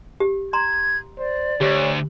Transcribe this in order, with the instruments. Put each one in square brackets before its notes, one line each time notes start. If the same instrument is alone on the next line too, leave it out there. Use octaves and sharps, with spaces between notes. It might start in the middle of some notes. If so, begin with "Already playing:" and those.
[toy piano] G4
[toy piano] A#5 C6 [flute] G#6
[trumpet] C5 [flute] D5
[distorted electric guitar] D2 [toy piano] G4 [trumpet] C#5